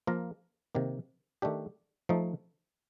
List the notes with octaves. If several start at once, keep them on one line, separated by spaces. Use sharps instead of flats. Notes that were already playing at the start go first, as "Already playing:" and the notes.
F3 A#3 F4 A#4
C3 D#3 A#3
D#3 A3 D4 G4
F3 A3 D#4